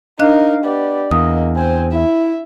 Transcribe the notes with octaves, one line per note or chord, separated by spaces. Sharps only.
D4 D#4 A#4 D#5 F5 F#6
B3 G4 D5
E2 A#3 D#5 D#6
C4 C5 G#5
E4 E5